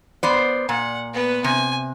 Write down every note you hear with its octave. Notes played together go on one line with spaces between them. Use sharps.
B3 C5 D5
A#2 F#5
B3 B4
C3 G#5